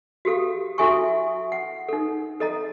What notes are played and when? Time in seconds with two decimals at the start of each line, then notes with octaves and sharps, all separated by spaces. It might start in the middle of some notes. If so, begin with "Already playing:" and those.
0.25 F#4 G4 A4 F5
0.78 E4 F#4 A4 E5 G#5 C#6
1.52 F#5
1.88 D#4 A4
2.40 A4 D#5 A#5